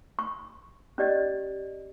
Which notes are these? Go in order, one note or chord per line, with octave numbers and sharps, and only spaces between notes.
C#6
C#4 G4 D5 D#5